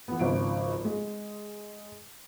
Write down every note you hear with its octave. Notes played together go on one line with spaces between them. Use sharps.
E3 B3
G#1 C#2 F3 D7
G#3